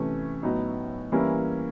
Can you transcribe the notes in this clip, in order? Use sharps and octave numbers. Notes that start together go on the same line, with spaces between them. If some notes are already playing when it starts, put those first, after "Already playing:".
Already playing: C3 E3 A3 C#4
A2 F#3 B3 D#4
E3 G3 A#3 C#4 E4